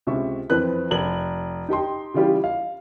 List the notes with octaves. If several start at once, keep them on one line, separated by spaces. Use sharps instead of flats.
C#2 C3 E5 C#6
F2 E3 C4 B4 F#6
F1 F#7
D#4 G4 G5 C6
C#3 E3 G3 F4 G4
F5